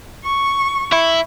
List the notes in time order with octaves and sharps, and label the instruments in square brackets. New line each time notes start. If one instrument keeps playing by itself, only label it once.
[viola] C#6
[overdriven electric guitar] E4